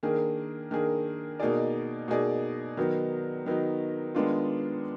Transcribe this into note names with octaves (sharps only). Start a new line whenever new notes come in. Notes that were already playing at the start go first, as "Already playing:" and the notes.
D#3 A#3 D4 G#4
D#3 A#3 D4 G#4
B2 A#3 D#4 G#4 D5
B2 A#3 D#4 G#4 D5
D#3 F#3 B3 D#4
D#3 F#3 B3 D#4
D#3 G#3 B3 D4 F4